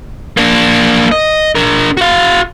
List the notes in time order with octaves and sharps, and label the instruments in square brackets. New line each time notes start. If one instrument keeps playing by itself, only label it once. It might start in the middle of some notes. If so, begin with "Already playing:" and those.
[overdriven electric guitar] A#3 D4
D#5
D4 A#4
F#4 F5